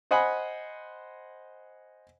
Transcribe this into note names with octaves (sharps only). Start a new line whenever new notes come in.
C5 D#5 F#5 G#5 B5